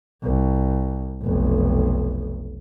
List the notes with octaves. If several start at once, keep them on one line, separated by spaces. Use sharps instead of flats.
C2
F1 B1